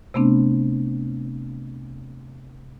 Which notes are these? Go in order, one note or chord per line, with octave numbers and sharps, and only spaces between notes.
C3 A3 B3 C4 D4